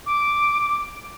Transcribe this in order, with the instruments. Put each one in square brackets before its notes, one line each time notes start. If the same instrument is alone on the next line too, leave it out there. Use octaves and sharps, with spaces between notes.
[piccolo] D6